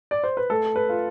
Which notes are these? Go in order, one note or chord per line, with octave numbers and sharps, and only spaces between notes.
D5
C5
B4
A3 A4
B4
F4